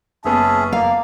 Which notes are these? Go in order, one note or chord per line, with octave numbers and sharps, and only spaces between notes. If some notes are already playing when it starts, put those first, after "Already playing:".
F#1 B3 C#4 G#4 E5 A5
A#3 D5 F5